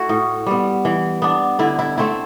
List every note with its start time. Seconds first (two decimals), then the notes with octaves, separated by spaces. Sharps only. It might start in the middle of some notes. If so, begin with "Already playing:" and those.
Already playing: A3 E4 F#4
0.09 A2
0.47 G3 B3
0.85 E3
1.22 B3 D4
1.59 D3 E4
1.79 E4
1.98 A3 C4 E4